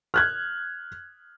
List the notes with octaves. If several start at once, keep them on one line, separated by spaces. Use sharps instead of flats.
F6 F#6 G#6